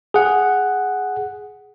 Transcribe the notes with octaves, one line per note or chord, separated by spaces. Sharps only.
G#4 F#5